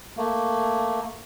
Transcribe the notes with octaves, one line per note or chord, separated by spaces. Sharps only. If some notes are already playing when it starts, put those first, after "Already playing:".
A3 A#3